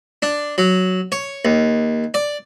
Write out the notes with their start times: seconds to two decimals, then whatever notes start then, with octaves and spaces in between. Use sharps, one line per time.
0.22 D4
0.58 F#3
1.12 C#5
1.45 D#2
2.14 D5